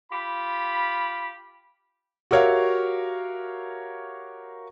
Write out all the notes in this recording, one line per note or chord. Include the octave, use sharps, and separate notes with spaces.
F4 G4 B5
F#4 G4 A#4 C#5 E5 F5